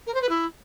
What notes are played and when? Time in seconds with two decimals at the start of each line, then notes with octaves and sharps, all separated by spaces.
0.07 A#4
0.14 C5
0.21 B4
0.29 E4